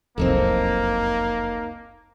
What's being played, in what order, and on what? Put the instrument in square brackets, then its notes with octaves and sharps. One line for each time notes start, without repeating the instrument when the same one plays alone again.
[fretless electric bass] F1 C2 F#2 [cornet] A#3 [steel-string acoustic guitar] C4 D#4 A4